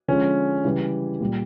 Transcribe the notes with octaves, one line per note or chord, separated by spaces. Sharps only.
D3 F3 G#3 C#4
C#3 E3 G3
A#2 G3